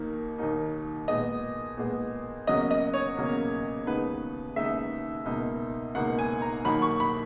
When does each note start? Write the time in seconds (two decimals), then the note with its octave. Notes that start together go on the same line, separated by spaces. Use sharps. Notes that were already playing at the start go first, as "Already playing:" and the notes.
Already playing: D#2 D#3 A#3 D#4
0.38 D#2 D#3 A#3 D#4
1.08 A#2 G#3 B3 D#5
1.77 A#2 G#3 B3
2.47 E2 C#3 F#3 A#3 C#4 D#5
2.71 D#5
2.94 C#5
3.17 E2 C#3 F#3 A#3 C#4
3.86 D#2 C#3 G#3 B3 D#4 B4
4.56 D#2 C#3 G#3 B3 D#4 E5
5.25 C#2 B2 A#3 D#4
5.95 C#2 B2 A#3 D#4 F#5
6.19 G#5
6.42 A#5
6.65 D#2 D#3 F#3 A#3 B5
6.82 C#6
7.00 B5